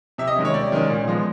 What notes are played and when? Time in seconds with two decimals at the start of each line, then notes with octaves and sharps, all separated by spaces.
0.18 C3 E5
0.27 D#5
0.36 D#3 G#3 C#4
0.45 C#5
0.54 C3 D5
0.72 D#3 G#3 C#4
0.90 A#2
1.07 F3 G#3 B3